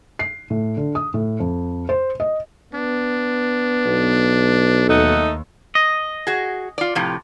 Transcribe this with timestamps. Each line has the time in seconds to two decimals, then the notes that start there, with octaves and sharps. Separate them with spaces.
0.19 C7
0.50 A2
0.77 D3
0.95 D#6
1.14 A2
1.40 F2
1.89 C5
2.20 D#5
2.74 B3 D4
3.86 B1
4.89 D#2 A3 D#4 A4 F#5
5.75 D#5
6.27 F#4 G#4
6.78 F4 D5
6.95 A2 C3 F3